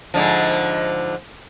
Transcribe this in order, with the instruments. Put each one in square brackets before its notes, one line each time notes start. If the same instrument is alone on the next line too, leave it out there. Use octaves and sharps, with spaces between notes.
[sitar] G#2 D3 F3